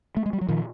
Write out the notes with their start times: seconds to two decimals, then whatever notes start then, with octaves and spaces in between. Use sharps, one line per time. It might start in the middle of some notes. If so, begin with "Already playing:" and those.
0.17 A3
0.26 G#3
0.33 G3
0.41 F#3
0.48 A#2 D#3 F3